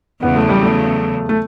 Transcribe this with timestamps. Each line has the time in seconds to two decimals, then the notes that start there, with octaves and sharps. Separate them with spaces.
0.23 E2 C#3 F#3 B3
0.36 A3
0.49 G3
0.63 A3
1.29 A3